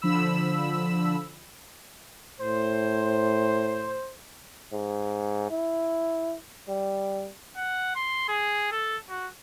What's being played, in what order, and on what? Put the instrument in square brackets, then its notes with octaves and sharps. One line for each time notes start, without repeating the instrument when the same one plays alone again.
[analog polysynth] D3 F3 B5 E6
[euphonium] A2 [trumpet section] C5
[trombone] G#2
E4
G3
[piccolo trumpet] F#5
C6
G#4
A4
F#4